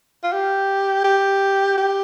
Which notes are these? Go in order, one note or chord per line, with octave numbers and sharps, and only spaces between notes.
F4
G4
G4
G4